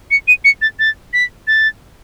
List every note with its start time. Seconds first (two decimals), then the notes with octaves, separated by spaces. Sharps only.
0.11 C#7
0.28 D#7
0.45 C#7
0.62 A6
0.79 A6
1.13 B6
1.47 A6